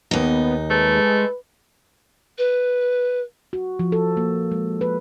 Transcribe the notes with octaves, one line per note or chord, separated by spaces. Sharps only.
D#2 B3 D#4
G#3 A3 B4
B4
F#4
F3
A4
A#3
G#3
B4